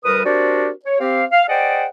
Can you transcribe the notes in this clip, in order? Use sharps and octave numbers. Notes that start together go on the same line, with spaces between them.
D2 G3 A#4 B4 D#6
C4 D4 F#4 G4 A#4 D5
C#5
C4 G4 F5
F5
G#4 C5 D5 D#5 F#5 G5